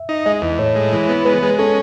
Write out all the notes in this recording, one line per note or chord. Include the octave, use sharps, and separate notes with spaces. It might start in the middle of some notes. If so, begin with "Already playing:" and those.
Already playing: E5
D#4
G#3 D#5
E2
A2 C#5
G#3
E3
B3
G#3 B4
G#3
C#4 A4